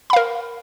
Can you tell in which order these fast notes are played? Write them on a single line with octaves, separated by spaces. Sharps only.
B5 F5 A#4